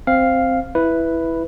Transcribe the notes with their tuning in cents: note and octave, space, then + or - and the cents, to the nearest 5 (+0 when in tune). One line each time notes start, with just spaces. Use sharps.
C4 +0 F5 +0
E4 +0 B4 +0